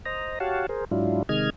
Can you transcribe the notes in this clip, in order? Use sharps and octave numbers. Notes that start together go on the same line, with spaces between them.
C5 D#5 A#5
F#4 G4 C#5 F5 F#5 A5
G#4 A#4 C5
G#2 F#3 D4 E4 F4
C3 D#3 G#3 D#5 F6 G#6